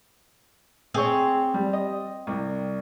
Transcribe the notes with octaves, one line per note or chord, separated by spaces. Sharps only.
C4 G#4 C#5
G3
D#5
C2